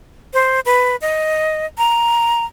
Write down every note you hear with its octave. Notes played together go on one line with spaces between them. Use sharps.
C5
B4
D#5
A#5